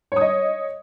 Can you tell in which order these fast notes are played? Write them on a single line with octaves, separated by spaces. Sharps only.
C#5 D#6 D#5